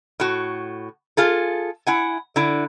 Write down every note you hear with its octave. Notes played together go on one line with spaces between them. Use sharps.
A2 F#4
F4 G#4 A4
E4 F#5 G#5
D3 E4